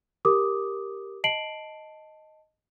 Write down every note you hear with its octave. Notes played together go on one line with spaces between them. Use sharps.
G4 A#4 D6 D#6
D#5 A5 C7 D7 F#7